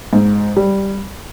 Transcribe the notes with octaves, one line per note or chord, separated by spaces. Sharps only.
G#2
G3